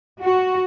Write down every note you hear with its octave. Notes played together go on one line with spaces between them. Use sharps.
F#4